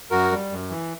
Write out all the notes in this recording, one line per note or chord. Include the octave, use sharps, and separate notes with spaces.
F#2 F#4 A#4
G3
F#2
E3